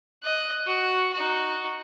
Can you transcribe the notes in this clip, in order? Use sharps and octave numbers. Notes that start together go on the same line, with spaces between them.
D#5 F#6
F#4
D#4 F#4